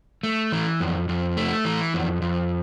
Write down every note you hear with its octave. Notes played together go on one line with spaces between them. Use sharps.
A3
E3
F2
F2
A3
E3
F2
F2